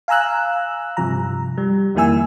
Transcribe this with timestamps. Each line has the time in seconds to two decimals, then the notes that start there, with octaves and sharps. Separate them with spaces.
0.08 F5 G#5 A#5 E6 F#6
0.97 G2 C3 F3 A#5
1.58 G3
1.95 F2 D#3 A#3 E4 G#5 E6